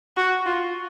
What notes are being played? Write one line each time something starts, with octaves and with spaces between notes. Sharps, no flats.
F#4
F4